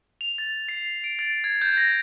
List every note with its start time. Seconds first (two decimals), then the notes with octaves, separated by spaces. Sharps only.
0.21 F7
0.38 A6
0.69 C7
1.04 D7
1.19 A6
1.44 G#6
1.62 G6
1.77 A#6